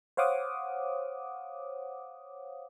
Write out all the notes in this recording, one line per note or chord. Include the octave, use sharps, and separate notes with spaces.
C5 C#5 F5 F#5 D6 D#6